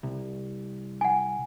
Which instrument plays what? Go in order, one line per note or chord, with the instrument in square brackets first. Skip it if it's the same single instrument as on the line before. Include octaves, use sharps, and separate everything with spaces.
[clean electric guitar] C2
[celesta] F#5 G#5